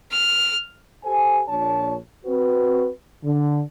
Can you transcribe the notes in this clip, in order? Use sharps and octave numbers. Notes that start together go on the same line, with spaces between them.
F6
G4 A4 C5 G#5
A#1 A#2 D4 C#5 A5
C4 F#4 B4
D3